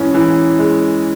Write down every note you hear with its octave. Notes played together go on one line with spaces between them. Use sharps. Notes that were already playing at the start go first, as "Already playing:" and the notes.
Already playing: G#2 E3 C#4
E3
G#3